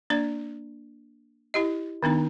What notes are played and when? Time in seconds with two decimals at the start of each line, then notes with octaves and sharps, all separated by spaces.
0.10 A#3 D4 D5
1.54 E4 G4 D#5
2.03 D#3 B3 D4 D#4